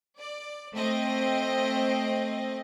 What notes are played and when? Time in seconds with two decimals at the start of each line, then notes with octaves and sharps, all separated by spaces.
0.17 D5
0.72 A3 C4 D#5